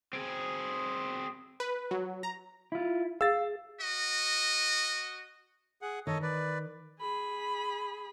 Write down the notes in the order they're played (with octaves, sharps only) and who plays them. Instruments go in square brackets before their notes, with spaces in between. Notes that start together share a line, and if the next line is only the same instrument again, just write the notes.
[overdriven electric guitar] C4 G#4
[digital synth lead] B4
F#3
A#5
[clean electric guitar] E4 F4
[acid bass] G#4 [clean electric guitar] F5 [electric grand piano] E6 A6
[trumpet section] F#4 D#5
[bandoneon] G#4 F#5
[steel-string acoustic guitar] D#3 [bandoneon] A4 C#5 D#5
[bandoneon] B4 D5
[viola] G#4 B5